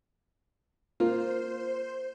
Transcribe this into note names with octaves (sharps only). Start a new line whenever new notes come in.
A#3 F4 C5